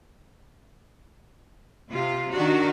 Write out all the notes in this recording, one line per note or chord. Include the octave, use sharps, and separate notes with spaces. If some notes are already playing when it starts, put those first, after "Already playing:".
C3 F4
D#3 D4 F#4